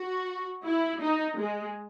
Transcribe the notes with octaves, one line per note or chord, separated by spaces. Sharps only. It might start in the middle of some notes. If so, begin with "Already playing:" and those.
Already playing: F#4
E4
D#4
G#3